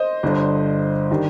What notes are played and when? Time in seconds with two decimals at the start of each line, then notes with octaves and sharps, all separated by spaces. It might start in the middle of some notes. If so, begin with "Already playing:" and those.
Already playing: C5 D#5
0.23 G1 G2 D3
1.11 D#3 G3 D4